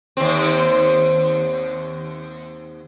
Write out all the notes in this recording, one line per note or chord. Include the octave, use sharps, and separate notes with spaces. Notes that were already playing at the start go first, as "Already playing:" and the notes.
D#2 C4